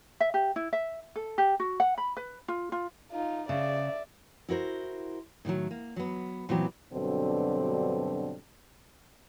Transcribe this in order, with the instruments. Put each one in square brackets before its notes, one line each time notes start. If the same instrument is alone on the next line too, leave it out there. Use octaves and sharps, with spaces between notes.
[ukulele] E5
G4
E4
E5
A4
G4
F#4
F#5
B5
B4
F4
F4
[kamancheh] D#4 F4
[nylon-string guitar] C#3 [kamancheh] D5 E5
[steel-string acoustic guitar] E4 F#4 A#4 C5
A2 D3 D#3 F#3
A#3
F#3 B3
A#2 E3 F#3 B3 C4 G4
[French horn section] G2 B2 D3 F#3 C4 A4